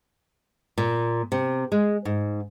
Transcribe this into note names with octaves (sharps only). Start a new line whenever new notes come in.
A#2
C3
G#3
G#2